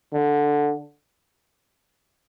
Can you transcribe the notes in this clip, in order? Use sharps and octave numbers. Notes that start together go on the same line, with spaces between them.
D3